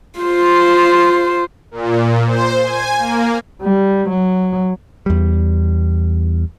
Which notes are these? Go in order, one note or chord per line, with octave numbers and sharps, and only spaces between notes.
F4 C5
A#2
C5
G#5
A#3
G3
F#3
E2 G3